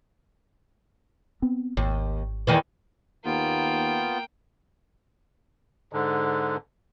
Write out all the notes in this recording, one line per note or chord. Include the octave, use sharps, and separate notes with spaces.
B3 C4
G#1 D#2
E2 D#3 E3
D#2 A#3 B3 F4 G5
G#2 D3